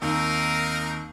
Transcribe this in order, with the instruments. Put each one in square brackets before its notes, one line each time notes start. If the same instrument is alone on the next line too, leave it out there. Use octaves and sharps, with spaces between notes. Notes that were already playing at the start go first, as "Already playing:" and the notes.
[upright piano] D#2 [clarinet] C4 [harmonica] D#4 A#4 F5